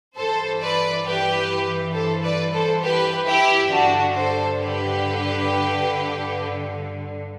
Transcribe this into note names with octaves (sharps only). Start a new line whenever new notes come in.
G2 E3 A4 C5
B4 D5
G4 B4
A4 C5
B4 D5
A4 C5
G4 B4
E4 G4
G2 D3 D4 F#4
A4 C5
G4 B4